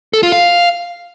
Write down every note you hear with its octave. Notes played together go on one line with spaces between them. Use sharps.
A4
F4
F5